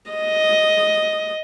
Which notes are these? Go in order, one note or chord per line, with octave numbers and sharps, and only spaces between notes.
D#5